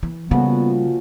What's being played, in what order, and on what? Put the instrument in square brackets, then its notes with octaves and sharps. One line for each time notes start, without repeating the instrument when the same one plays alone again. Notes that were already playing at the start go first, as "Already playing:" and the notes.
[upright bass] E3
[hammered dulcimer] A#2 F3 F#4 [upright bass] C#3 G3 [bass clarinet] B3